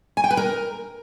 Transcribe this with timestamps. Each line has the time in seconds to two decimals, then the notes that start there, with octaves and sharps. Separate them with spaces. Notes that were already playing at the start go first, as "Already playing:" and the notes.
0.17 G#5
0.24 G5
0.31 B4
0.37 A#4